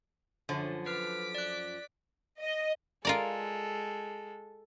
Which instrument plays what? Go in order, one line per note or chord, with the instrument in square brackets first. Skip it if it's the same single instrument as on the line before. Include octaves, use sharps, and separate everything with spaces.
[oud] F#2 F3 [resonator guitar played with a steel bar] D3 [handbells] C#5
[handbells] B4 F6 [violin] D6 B6
[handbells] D5 F#6
[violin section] D#5
[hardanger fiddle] G#3 A4 [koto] F4 A#4 D5